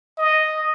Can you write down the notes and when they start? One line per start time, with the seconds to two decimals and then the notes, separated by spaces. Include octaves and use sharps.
0.18 D#5